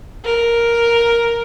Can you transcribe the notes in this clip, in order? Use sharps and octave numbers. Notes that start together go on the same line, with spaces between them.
A#4